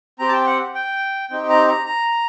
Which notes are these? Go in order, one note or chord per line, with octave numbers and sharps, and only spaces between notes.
C4 G4 A#5
A5
G5
F#5
G5
C4 D#4 G4 G5
A#5
A#5
A#5